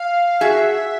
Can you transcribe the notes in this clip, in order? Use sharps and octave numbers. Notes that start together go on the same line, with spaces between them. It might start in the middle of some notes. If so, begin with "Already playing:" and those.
Already playing: F5
F#4 G#4 E5